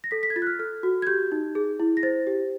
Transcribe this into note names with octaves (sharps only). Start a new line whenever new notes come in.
A#6
A4 B6
B6
G#6
F4 A6
F#6
F6
A4 F6
F#4
G#6
G4 G6
D#4
G#4
E4
A#6
C5 A6
G4